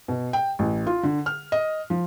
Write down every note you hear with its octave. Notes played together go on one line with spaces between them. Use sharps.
B2
G5
A1
F4
D3
F6
D#5
F3